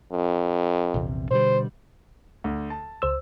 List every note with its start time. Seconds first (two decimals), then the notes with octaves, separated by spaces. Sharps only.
0.12 F2
0.94 A#1 E2 C3
1.31 B2 D3 G3 C5
2.44 D2
2.70 A5
3.02 C#2 C5 E6